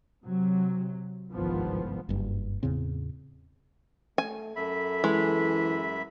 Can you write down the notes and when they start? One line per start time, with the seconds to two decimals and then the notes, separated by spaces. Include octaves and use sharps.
0.23 C3 F#3
1.31 G1 C2 G#2 D#3 F3 B3
2.09 F#1 G2
2.63 E2 A2 C#3 C4
4.18 A3 G#5
4.56 F#2 A4 E5 B5
5.04 E3 G#3